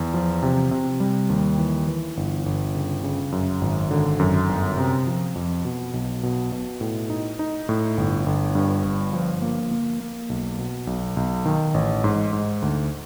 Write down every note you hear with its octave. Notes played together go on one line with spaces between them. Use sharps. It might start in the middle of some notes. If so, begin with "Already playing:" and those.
Already playing: E2
F3
C3
C3
G3
D#2
E3
E3
G1
G1
C#3
C#3
F#2
G#1
D3
F#2
G1
C3
F3
F2
B2
B1
B2
B2
A2
D#4
D#4
A2
G1
G1
G2
G1
F3
A#3
A#3
A#3
B1
B2
B1
B1
D#3
A1
G#2
G#2
D2